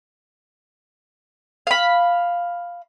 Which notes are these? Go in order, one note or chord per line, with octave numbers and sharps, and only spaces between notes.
F5 B5